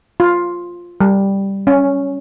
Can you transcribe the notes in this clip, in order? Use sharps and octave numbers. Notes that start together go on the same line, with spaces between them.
F4
G3
C#4